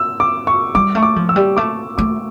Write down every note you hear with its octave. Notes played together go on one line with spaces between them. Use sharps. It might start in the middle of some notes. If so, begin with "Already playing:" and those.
Already playing: E6
D6
C#6
G3 D6
A3 C#6
D6
F3
E6
G3
A3 D6
A3 D6